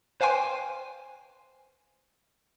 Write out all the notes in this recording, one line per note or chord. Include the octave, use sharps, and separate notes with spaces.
B4 C5 F5 G5 G#5 C6